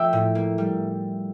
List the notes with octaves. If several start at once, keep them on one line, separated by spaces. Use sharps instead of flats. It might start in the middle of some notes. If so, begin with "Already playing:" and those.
Already playing: F3 A3 D4 E5 G5
A2
A#3
G3